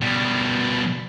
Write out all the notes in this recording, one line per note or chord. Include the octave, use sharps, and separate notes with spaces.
B2 G3